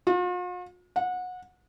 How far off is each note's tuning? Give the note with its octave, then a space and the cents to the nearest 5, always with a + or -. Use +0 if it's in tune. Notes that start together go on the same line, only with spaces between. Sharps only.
F4 +45
F#5 -25